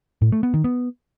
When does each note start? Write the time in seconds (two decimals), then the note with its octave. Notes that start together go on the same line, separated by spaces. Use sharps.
0.22 A2
0.32 A3
0.43 B3
0.54 D#3
0.64 B3